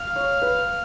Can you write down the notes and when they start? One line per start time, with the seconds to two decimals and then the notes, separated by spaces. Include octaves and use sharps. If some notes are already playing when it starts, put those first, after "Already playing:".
Already playing: F5
0.16 C#5
0.42 B4